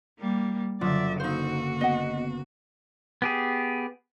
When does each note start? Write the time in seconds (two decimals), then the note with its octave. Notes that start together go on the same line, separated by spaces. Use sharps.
0.19 G3 A#3
0.81 F#1 D3 F#3 F4 D5 E5
1.20 A#3 D#4 F#4 C5 F5 E6
1.81 B3 D#5 F#5
3.22 B3 G4 G#4